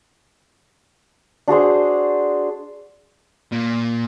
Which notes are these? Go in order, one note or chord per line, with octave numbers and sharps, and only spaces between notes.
D4 F#4 G#4 C5
A#2